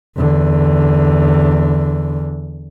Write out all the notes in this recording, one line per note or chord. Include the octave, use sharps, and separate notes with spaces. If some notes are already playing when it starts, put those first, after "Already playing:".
E2 D3